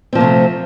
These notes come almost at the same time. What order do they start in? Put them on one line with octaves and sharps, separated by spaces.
C4 F3 A#3 C3 A3